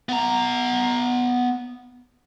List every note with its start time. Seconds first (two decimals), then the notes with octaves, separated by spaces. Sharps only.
0.09 B3 A#5